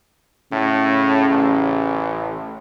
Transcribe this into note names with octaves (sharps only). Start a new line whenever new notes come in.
A2 C#3
A1